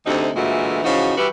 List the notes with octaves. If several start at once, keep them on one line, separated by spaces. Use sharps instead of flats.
D2 C3 D#4
D2 A#2 E3 G#3 A3 F#4
C#3 E3 F3 D#4 F#4
E3 G3 E4 F#4 G4 B4